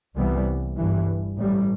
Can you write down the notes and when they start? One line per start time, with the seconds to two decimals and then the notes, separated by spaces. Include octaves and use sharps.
0.16 C2 C3 E3 G3 B3
0.77 G1 G2 E3
1.38 A1 A2 G3